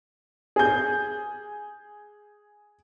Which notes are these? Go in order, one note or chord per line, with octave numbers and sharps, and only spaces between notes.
G#4 G6